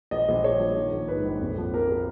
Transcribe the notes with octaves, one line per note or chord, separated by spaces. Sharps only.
A#1 D#5
A#1
A#1 C#5
F3
D#3
A#1
G#2 B4
A#1
F2
F3
A#3 A#4
A#3